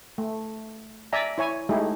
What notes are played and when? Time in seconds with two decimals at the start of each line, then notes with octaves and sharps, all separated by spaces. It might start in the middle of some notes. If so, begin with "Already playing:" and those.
0.18 A3
1.13 D5 E5 G#5 A#5
1.38 E4 C#5 G#5
1.69 G#3 A3 D#4 E4 G4 G#4